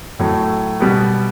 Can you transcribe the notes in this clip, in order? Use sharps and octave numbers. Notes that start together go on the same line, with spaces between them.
A2 F#3 A3
B2 G3 B3